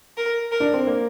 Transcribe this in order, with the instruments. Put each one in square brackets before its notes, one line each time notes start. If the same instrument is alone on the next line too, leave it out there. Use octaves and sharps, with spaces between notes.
[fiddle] A#4
A#4
[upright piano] D4
C4
A#3